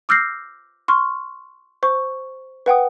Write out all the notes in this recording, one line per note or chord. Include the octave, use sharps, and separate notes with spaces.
D6 E6 F6 G6 A#6 C7
C6 C#6 F6
C5 C#6
B4 F#5 G5 D#6